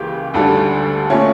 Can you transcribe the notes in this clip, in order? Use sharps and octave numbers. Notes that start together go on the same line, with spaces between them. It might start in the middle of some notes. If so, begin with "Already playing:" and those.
Already playing: C#2 C#3 E3 A#3 G4
D2 D3 G3 A4
A#2 A3 C#4